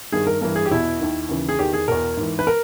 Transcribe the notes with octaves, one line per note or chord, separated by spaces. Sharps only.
G2 D#3 G#4
A#4
G2 E3 A#4
G#4
G4
E2 B2 E4
D#2 D#3
D#2 C#3 E3
G#4
E2 D#3 G4
G#4
E2 B2 A#4
G#2 E3
B4
A#4